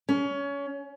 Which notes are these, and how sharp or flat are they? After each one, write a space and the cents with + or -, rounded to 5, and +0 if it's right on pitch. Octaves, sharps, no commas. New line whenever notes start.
C#4 +25